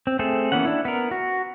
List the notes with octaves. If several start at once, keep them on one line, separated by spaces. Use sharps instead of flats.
C4
A3 C4 G#4 A4
E3 A#3 B3 C#4 F#5
D4 E4
B3 A#4
F#4